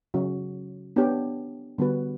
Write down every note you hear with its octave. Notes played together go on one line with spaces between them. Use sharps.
C#3 F#3 C#4 F#4
B3 D4 G4 C#5
D3 G3 B3 F#4 B4